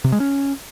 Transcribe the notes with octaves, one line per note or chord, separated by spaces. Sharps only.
C3
G#3
C#4